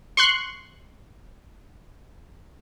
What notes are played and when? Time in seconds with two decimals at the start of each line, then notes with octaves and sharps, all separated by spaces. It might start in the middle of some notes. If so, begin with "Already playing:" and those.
0.17 C6 C#6 F#6